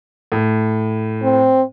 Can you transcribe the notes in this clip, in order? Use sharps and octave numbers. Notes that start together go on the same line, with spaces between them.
A2
C4